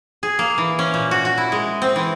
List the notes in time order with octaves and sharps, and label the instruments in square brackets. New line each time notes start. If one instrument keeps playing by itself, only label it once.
[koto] G#4
A#3
E3
C#4
A#2
F#4
F#4
E4
G#3
C4
E3